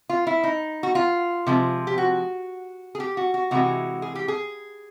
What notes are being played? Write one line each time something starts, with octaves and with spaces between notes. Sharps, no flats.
F4
E4
D#4
F#4
F4
C3 F3 G#3
G4
F#4
G#4
G4
F#4
F#4
C3 E3 G#3 F#4
G#4
G4
G#4